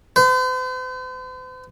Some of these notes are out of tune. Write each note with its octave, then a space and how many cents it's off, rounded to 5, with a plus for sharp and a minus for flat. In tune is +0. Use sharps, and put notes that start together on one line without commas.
C5 -45